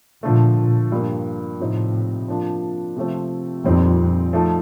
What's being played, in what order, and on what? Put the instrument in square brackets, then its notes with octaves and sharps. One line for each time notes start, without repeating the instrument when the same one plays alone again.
[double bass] A#2 [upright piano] D3 F3 A3
[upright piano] G2 F3 A#3
[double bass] A2 [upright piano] C3 F3 C4 D#4
[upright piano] F3 A#3 D4 F4
C3 F3 A3 C4
[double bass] F2 [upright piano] A#2 G3 C4 D#4 A4
[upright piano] F3 A3 D#4 A4